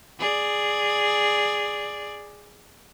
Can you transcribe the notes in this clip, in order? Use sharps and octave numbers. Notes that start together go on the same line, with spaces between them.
G#4 D5